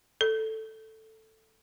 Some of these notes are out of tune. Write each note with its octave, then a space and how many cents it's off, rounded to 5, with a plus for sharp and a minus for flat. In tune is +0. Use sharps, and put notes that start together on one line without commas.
A4 +5